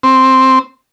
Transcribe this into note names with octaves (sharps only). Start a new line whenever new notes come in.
C4